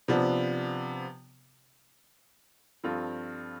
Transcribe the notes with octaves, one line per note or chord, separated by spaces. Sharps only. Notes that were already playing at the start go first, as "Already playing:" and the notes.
C3 F3 B3 D4
G2 F3 C4 F4 A4